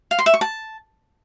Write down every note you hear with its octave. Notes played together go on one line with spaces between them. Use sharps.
F5
C6
E5
C#6
A5